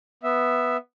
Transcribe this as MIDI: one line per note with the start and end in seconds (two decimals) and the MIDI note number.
0.23 0.77 59
0.23 0.77 76